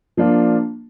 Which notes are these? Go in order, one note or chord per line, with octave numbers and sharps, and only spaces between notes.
F3 A#3 D4 F4